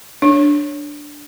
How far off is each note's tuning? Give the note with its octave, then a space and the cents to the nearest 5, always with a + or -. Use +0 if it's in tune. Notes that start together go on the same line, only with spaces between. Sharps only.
D4 +0 C#5 +0